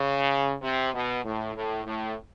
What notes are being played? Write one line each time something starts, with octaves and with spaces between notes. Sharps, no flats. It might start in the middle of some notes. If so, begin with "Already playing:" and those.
Already playing: C#3
C3
B2
A2
A2
A2